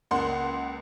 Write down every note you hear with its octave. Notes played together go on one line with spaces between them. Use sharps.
C#2 A#3 F#5 C6